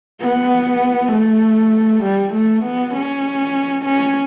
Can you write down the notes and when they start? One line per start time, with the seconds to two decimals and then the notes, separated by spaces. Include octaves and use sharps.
0.21 B3
1.12 A3
2.03 G3
2.34 A3
2.64 B3
2.94 C#4
3.85 C#4